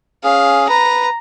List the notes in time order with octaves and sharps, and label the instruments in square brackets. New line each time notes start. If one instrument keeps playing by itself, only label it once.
[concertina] C#4 G#4 [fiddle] F5
[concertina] B4 [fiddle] A#5